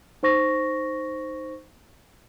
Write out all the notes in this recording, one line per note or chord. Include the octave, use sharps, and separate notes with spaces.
D#4 C5 C#6 A#6